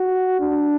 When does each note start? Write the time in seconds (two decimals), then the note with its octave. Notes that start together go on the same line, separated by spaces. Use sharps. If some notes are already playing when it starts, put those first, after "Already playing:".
Already playing: F#4
0.39 D4